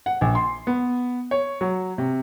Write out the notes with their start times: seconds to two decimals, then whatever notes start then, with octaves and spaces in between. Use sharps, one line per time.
0.06 F#5
0.21 A#1
0.35 C6
0.67 B3
1.31 C#5
1.61 F#3
1.98 C3